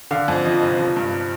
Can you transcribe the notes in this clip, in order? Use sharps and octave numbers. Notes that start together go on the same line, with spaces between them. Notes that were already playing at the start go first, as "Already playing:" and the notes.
D3 F5
F2
F3 D#5
F1
F3
G2